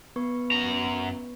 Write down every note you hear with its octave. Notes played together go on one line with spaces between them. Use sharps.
B3 B4 C#6
F#2 A#5